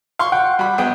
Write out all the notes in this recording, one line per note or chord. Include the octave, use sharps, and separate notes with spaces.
F5 C6 C#6
F#5 G5
G3 B5
A#1 B3 G5